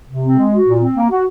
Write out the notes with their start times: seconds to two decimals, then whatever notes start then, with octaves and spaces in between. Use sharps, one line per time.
0.09 C3
0.22 C4
0.37 G#3
0.52 F#4
0.66 A#2
0.80 C4
0.95 A#3
1.11 F#4